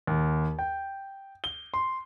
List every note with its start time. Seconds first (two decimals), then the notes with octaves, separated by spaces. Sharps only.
0.07 D#2
0.59 G5
1.44 G7
1.74 C6